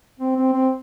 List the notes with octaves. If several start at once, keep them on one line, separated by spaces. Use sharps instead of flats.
C4
C4
C4